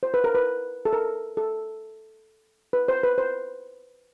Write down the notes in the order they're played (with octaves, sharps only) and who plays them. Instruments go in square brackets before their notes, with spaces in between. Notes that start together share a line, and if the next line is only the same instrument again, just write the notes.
[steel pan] C5
B4
A#4
B4
A4
A#4
A4
B4
C5
B4
C5